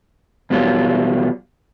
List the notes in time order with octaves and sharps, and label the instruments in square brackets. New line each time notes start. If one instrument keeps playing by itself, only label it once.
[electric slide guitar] E2 B2 F#3 G3 F4